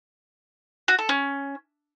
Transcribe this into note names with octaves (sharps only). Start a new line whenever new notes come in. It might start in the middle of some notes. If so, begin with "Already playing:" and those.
F#4
A4
C#4